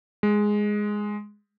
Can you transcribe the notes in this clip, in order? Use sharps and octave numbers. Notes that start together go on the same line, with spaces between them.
G#3